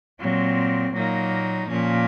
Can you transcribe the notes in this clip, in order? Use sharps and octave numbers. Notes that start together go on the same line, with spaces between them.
A#2 F#3 C4
A#2 F#3 A#3 D#4
A#2 F3 A#3 C#4